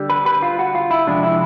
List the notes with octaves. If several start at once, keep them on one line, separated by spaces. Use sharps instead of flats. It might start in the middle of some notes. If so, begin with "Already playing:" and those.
Already playing: D3 G3
B4
B4
F4
F#4
F4
E4
C3 F3 G#3 D4
E4